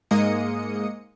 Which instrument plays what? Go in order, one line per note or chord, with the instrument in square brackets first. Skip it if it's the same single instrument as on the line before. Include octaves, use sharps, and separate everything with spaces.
[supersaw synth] G#2 G#3 A#3 D#5 D#6 C#7